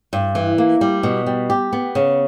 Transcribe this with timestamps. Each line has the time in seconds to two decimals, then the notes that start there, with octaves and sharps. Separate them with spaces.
0.13 G2
0.35 E3
0.58 A#3
0.81 G3
1.03 B2
1.26 G3
1.50 G4
1.73 B3
1.95 C#3